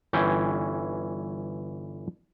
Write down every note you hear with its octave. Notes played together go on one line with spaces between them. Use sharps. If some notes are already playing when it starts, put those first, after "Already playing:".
G1 E3 C#4 G5